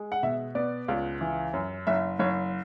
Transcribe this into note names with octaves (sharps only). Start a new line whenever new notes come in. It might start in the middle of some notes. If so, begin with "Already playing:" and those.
Already playing: G#3
F#5
B2 E5
B3 D5
C#2
E3
F#2
F#1 E5
F#1 C#5